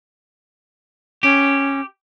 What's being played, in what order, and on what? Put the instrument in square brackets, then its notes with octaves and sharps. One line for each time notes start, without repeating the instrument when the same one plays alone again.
[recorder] C#4 [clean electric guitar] G4